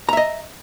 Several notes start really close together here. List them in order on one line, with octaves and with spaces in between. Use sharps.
A#5 E5 D#5